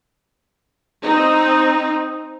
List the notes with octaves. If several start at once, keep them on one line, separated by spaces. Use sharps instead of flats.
C4 D#4